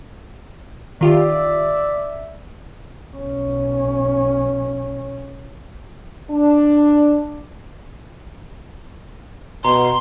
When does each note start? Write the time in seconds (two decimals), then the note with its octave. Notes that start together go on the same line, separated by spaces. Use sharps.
1.01 D#3 F4 G4 D5 E5
3.16 B1 C#4
6.30 D4
9.65 B2 A#5 C6